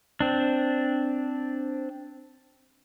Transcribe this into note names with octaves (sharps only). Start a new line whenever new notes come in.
C4 D4